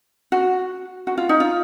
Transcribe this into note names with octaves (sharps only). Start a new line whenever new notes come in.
F#4
F#4
F4
D#4
F4